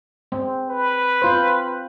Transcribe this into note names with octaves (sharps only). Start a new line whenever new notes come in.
G#3 C4
B4
C4 F4 C5